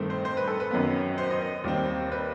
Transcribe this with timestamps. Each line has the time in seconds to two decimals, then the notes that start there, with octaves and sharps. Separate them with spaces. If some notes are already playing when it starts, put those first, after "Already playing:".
Already playing: G2 D#3 A3 C4
0.10 C5
0.25 C5
0.37 B4
0.48 A4
0.60 B4
0.71 F#2 D#3 F#3 B3
1.18 C5
1.30 D#5
1.41 D#5
1.64 D#2 D#3 G3 C4
2.12 B4